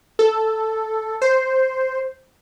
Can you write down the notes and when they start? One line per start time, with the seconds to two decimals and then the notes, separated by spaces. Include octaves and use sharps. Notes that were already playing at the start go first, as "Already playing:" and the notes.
0.19 A4
1.22 C5